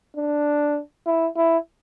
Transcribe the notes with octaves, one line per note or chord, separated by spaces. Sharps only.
D4
E4
E4